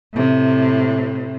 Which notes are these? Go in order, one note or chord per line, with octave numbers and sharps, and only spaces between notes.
A2 C3